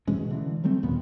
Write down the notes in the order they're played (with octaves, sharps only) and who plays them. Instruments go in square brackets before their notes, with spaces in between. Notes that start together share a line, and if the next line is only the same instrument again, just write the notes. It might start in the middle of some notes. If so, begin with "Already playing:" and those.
[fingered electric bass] B2 E3 G#3 C#4
D3 E3
F#3 G3 A3 C4
D#2 A#2 D#3 B3